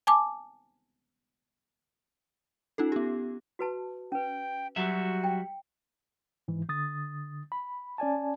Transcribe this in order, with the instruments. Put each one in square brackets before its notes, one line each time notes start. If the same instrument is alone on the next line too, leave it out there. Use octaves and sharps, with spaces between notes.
[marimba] G#5 A5 D6
[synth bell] C#4 D#4 F4 A4
B3 G4
[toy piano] F#4 B4 A5
[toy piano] C#4 B4 [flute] G5
[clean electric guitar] F#3 G3 E5 [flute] F#4
[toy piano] G5
[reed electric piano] G#2 E3
D3 D#6 A6
B5
C#4 D5 G#5 A5